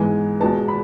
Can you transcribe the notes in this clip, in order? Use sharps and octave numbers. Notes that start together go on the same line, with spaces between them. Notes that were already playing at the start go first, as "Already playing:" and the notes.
Already playing: G#2 E3 G#3 B3 G#5
E2 B2 G#3 B3 A5
B5